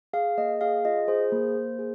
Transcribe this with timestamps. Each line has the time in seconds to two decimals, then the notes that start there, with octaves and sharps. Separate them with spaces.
0.13 G#4 F5
0.38 A#3 D#5
0.61 G#4 F5
0.85 F4 D#5
1.08 G#4 C5
1.32 A#3
1.56 A#3
1.79 G#4